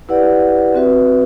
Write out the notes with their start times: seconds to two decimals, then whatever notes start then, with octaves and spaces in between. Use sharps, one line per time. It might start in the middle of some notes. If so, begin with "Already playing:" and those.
0.09 E4 G4 B4 D5 F#5
0.74 C4 F#4 B4 E5